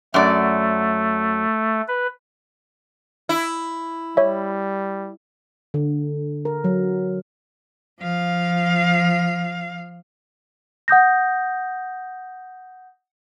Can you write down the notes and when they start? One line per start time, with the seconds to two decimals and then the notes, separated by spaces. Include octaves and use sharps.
0.14 F#2 F#3 A3 D5
1.88 B4
3.29 E4
4.17 G3 C#5 E5
5.74 D3
6.45 A#4
6.64 F#3
8.00 F3 F5
10.88 F#5 D#6 G6 A#6